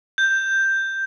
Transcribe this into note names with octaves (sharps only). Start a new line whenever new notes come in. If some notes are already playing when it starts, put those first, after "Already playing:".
G6